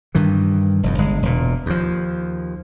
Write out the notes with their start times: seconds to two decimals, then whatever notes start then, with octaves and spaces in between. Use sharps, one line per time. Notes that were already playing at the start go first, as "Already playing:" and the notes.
0.15 G2 D#3 E3
0.83 F1 E2
0.98 G1 G#3
1.23 E1 A#2
1.66 D#2 F3